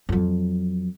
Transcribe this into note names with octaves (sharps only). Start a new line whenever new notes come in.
F2 F#3